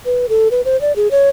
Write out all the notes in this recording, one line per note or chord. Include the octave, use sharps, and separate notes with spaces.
B4
A4
B4
C5
D5
G#4
C#5